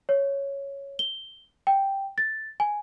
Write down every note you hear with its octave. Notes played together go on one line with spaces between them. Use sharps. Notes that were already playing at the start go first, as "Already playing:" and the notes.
C#5
G7
G5
A6
G#5